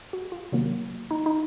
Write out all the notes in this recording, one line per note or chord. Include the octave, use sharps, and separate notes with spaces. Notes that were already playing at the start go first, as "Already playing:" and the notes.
F#4
F4
C3 D#3 F#3 A#3
D#4
D#4